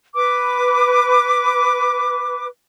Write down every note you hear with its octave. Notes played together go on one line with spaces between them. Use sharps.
B4 D6